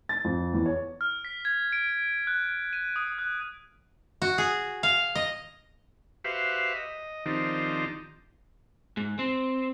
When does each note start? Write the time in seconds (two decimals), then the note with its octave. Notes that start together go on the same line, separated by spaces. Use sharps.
0.09 A6
0.24 F2
0.53 E2
0.66 C#5
1.01 F6
1.25 B6
1.45 G#6
1.72 D7
2.27 F#6
2.73 D#7
2.96 D#6
3.19 F#6
4.22 F#4
4.38 G#4
4.83 F5
5.15 D#5
6.24 F#4 G4 B4 C5 E5 F5
6.75 D#5
7.26 D#3 F3 C4 D4 D#4 G4
8.97 G#2
9.19 C4